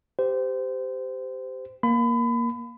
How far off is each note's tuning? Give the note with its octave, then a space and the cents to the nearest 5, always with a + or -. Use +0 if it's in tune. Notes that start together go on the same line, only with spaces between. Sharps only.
G4 +0 C5 -25
A#3 +10 B5 +30